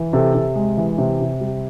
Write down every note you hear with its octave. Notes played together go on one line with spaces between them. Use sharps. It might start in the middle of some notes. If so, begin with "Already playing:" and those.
Already playing: E3
C3 A4
C3
G#3
E3
C3
C3
G3